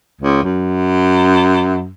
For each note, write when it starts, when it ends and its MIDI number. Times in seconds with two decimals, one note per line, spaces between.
0.21 0.42 37
0.43 1.89 42